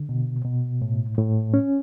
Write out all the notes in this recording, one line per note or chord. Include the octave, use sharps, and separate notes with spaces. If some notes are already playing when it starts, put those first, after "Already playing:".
Already playing: D3
B2
B2
A2
A2
C#4